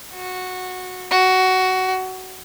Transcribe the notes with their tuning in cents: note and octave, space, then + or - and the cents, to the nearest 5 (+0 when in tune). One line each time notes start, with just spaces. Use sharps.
F#4 -10
F#4 +15